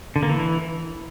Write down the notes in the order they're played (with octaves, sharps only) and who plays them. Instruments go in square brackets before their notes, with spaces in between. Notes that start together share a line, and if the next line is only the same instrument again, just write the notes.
[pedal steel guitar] D3
A#3
E3